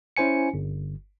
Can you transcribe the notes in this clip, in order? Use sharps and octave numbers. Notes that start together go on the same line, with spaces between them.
C#4 E4 C5 G#5 C#7
G1